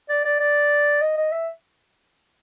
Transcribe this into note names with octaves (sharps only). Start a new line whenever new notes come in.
D5
D5
D5
D#5
D#5
E5